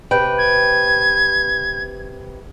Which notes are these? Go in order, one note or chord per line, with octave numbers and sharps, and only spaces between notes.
C3 B4 G5
G#6